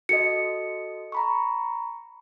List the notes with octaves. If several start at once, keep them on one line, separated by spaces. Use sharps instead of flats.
F#4 A4 D#5 C#7
A#5 B5 C#6